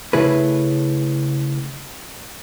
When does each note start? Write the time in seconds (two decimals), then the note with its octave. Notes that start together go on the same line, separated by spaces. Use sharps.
0.13 C#3 A3 E4 G#4 B4